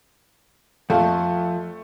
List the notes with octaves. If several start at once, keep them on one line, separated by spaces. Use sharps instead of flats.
F2 F3 A3 A5